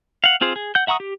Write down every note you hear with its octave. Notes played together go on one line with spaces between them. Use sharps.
F5 F#5
C4 F4 G#4 C5
G#4
F#5 G6
E5 F#5 A#5 C#6 D#6
G4